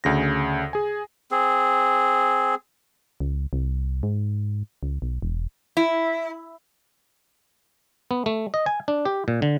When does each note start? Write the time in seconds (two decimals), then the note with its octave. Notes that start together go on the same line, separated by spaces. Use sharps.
0.04 D2 C#3 A#6
0.73 G#4 G#5
1.31 C4 G#4
3.20 C#2
3.53 C2
4.03 G#2
4.83 C#2
5.02 B1
5.22 E1
5.77 E4
8.11 B3
8.26 A3
8.54 D#5
8.66 G#5
8.88 D4
9.05 G4
9.28 A#2
9.42 D3